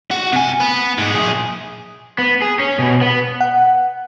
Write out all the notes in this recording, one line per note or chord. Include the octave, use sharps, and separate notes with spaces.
F#4
C3 G#5
B3
G#2 G#4
A#2 G#4
B3
G#4
C#4
B2
B3
F#5